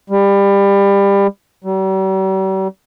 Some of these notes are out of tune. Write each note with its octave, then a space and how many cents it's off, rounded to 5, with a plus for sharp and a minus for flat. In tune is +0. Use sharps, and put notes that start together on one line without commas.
G3 +25
G3 -45